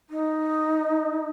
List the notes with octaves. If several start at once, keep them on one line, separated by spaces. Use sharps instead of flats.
D#4